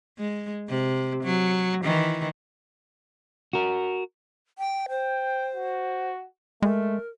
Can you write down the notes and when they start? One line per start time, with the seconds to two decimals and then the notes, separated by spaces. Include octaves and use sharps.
0.19 G#3
0.69 C3
1.24 F#3
1.83 D#3 E3
3.53 F#4 A#4
4.59 G5
4.89 C5 G5
5.55 F#4
6.62 G#3 A3 A#4